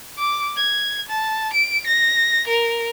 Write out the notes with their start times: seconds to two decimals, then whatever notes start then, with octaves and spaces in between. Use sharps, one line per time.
0.18 D6
0.57 G#6
1.09 A5
1.53 D7
1.86 A#6
2.47 A#4